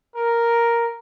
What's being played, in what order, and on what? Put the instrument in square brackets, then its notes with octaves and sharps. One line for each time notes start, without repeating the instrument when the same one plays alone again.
[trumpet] A#4